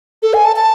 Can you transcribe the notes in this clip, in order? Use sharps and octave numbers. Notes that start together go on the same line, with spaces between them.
A4
G#5
A5
A5